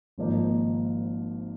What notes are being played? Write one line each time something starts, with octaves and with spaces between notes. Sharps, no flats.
G#1 G#2 F3 A#3 D#4